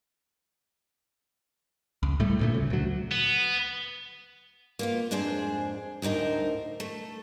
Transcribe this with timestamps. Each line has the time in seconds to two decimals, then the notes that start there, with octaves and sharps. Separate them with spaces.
2.03 C#2
2.20 A2 G3 A3
2.39 D2 A#2 A3
2.54 C#3
2.70 D2 F#3
3.11 B3
4.79 A#3 B3 F4
5.11 F2 G#2 D4 G#4 C5
6.02 D2 A2 D#4 A#4 C5
6.80 A3